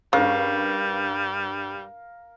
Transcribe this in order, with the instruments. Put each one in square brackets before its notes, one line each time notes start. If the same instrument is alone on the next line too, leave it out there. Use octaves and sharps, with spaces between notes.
[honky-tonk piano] G2 B4 C#6 [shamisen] C#3 [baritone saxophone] G3 [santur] A#4 F5